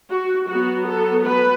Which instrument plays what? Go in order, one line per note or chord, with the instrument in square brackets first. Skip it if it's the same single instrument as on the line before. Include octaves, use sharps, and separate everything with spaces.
[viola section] F#4
F#3 B3 F#4
A4
B4